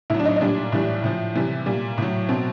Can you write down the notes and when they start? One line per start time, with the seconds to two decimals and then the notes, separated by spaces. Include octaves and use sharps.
0.10 A2 F#3 E4
0.20 D4
0.25 D#4
0.36 D#4
0.41 A#2 G3 D4
0.72 A2 E3 G3
1.04 A2 F3
1.35 C3 E3 G3
1.66 A#2 G3
1.98 A2 F#3
2.29 B2 F#3 C4